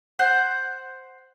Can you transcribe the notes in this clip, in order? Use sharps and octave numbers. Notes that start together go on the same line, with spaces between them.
C5 F#5 G6